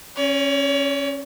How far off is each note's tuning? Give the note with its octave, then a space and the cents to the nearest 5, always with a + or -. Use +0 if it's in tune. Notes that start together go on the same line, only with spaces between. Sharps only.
C#4 -15 C#5 +40